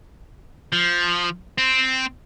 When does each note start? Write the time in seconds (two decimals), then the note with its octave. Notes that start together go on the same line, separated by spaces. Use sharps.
0.72 F3
1.58 C4